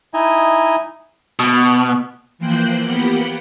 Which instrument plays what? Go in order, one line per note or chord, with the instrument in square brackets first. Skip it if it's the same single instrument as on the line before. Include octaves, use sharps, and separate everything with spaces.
[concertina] D#4 E4 D#5 G#5
[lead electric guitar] B2
[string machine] E3 F3 A#3 C5 G5 F#6
A#3 B3 G4 F#5 G5 B5